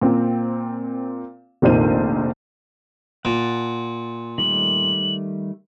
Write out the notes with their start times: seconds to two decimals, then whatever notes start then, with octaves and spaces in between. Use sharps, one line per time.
0.01 A#2 C4
1.62 F1 A#1 A#2 D#3 C5 D#7
3.25 A#2 F#5 A5
4.38 D#3 G3 A3 F#7